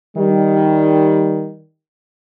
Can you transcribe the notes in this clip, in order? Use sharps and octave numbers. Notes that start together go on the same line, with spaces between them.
D#3 G3